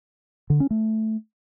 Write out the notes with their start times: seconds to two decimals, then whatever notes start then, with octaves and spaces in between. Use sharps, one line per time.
0.50 D3
0.60 C#4
0.71 A3